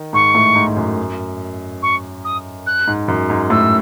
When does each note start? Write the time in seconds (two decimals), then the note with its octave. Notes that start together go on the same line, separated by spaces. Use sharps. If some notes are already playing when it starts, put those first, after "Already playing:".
Already playing: D#3
0.13 G#2 C#6
0.35 A2
0.56 G#2
0.67 G#2
0.77 F#2
1.82 C#6
2.24 D#6
2.66 F#6
2.88 G#2
3.08 F#2
3.30 G#2
3.50 A2 E6